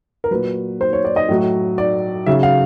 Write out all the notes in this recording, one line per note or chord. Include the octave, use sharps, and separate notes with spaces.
A#4
A#2 F#3 B4
C5
C#5
D5
D#5
A2 F#3
D5
C#3 F#3 E5
F5